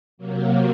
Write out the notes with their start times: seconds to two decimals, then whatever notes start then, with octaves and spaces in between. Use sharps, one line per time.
0.18 C3 F#3 A#3